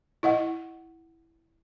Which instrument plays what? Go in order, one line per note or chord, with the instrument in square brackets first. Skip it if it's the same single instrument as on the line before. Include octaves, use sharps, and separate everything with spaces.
[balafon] E4 D#5 F#5